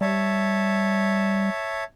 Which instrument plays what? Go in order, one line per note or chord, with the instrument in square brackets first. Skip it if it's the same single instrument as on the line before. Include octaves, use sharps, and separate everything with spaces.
[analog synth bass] G3 [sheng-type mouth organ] C#5 E5 A5